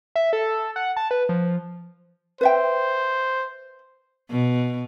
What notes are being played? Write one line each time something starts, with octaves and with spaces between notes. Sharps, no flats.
E5
A4
F#5
A5
B4
F3
B4 C5 E5 G5
B2